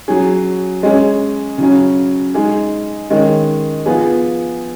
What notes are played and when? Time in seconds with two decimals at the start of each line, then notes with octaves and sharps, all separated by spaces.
0.08 F#3 C#4 G#4
0.83 G#3 C#4 G#4
1.58 C#3 F#3 C#4
2.34 G#3 D#4 G#4
3.10 D#3 G#3 C#4
3.86 F3 B3 F4 G#4